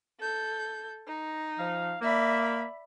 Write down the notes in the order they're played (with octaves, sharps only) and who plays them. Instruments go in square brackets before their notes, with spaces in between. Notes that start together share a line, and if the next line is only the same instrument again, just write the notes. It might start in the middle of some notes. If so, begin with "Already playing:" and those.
[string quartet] A4 G6
D#4
[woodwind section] F3 F5
[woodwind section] A#3 [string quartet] D5 E5 B5